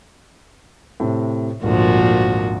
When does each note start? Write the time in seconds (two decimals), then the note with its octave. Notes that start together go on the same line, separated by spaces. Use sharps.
1.00 A2 C3
1.63 G#1 D2 A#2 F3 F#4